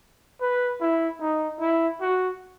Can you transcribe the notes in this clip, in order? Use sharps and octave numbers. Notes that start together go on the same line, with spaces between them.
B4
E4
D#4
E4
F#4